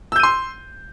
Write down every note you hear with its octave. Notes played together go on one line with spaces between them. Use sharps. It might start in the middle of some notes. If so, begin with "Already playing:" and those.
C6 E6 G6 D#7